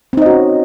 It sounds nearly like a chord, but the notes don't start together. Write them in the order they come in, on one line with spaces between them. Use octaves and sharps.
C4 D#4 D#5 F#4 C#4